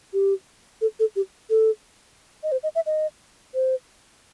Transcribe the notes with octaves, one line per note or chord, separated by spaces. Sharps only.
G4
A4
A4
G4
A4
D#5
C5
D#5
E5
D#5
C5